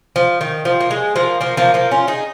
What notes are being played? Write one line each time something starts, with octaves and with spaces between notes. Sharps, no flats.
F3
D#3
F3
A#3
G#3
F3 A#3
F3 A#3
F3 A#3
F3 A#3
C#4 F4
D#4 G#4